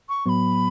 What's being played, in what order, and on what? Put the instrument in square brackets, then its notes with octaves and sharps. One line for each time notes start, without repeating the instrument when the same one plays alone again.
[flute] C#6
[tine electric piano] A2 F#3 B3 [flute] B5 C#6